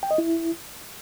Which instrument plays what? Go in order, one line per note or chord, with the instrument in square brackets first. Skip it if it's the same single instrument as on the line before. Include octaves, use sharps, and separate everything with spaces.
[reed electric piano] G5
D#5
E4